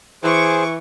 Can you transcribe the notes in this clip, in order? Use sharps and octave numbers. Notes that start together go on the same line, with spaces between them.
E3 G#4 C5 C#6 D6